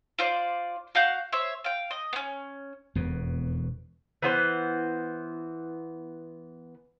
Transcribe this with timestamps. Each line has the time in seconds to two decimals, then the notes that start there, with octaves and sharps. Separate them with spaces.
0.18 F4 C5 D5
0.95 F#4 F5 F#5 G6
1.32 C5 C#5 E5
1.64 F5 G5
1.91 D#5
2.13 B3 C#4
2.95 E1 F2 B2
4.22 E3 B3 C5